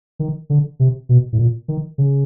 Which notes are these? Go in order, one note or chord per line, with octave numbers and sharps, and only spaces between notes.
D#3
D3
C3
B2
A2
A#2
D#3
C#3